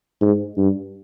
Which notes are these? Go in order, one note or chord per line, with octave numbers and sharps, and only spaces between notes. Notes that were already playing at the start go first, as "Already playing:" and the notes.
G#2
G2